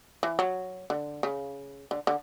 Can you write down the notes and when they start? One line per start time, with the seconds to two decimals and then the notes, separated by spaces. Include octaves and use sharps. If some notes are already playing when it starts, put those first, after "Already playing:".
0.23 E3
0.39 F#3
0.90 D3
1.23 C#3
1.91 D3
2.07 D3